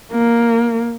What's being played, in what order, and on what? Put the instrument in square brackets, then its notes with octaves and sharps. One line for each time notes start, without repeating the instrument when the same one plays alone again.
[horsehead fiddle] A#3